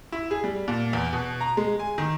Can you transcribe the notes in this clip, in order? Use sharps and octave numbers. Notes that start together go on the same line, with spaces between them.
E4
G#4
G3
A#2
E2
B2
A#5
G#3
G#5
D#3